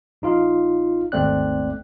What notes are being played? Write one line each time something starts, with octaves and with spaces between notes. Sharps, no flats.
A#1 D#4 F4 F5
G#1 D#2 A3 C4 D5 F#6